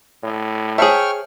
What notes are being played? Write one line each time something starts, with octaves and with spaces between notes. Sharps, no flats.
A2
G#4 C5 C#5 E5 G5 A5 C#6 F6